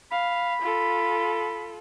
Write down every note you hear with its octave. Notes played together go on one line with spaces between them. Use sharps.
F5 B5
F4 A4